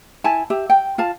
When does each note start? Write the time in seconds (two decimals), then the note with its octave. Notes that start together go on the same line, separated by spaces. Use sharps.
0.24 E4 G#5 A5
0.50 G4 E5
0.70 G5
0.98 F4 F5 A5